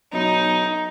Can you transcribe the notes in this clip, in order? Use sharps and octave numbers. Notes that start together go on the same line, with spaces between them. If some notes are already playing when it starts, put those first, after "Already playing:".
B1 D#4